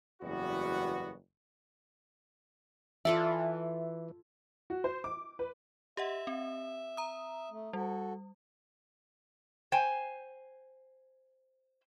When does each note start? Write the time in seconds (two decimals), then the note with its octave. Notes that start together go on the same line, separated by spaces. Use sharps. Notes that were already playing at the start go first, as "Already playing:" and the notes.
0.22 F#1 E2 G3 B3 F#4
3.05 E3 F4 A4 D5 E5
4.70 F#4
4.84 C5
5.04 D6
5.39 B4
5.97 G4 D#5 E5 F#5
6.27 C4
6.97 A#5 D#6
7.51 A3
7.73 G3 F#4 A4
9.72 C5 G5 G#5